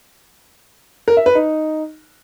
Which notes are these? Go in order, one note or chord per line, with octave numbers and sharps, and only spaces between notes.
A#4
E5
B4
D#4